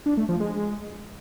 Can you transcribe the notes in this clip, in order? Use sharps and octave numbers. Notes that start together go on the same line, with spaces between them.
D4
A3
F3
G#3